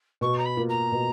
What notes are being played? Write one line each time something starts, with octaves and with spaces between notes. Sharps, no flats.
B2 C#6
A#5
B5
A#3 F4
A#5
B2